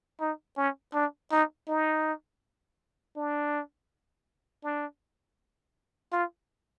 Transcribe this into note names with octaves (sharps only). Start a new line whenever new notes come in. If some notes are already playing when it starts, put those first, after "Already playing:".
D#4
C#4
D4
D#4
D#4
D4
D4
F4